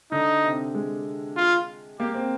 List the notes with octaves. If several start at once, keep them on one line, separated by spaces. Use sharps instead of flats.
D3 D#4
C3
G#3
F4
A#3 G4
C4